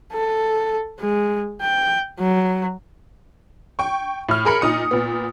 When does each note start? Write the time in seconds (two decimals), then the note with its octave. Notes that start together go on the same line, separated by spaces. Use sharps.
0.13 A4
1.00 G#3
1.62 G5
2.20 F#3
3.79 G5 C#6
4.29 A2 F6
4.45 G#4 A#4 B5 C#7
4.61 A#2 D#4 D#6 C#7
4.91 A#2 B3